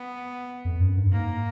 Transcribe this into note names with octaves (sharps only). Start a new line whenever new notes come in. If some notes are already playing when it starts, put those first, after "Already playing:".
Already playing: B3
F2
F#2
G2
G#2 A#3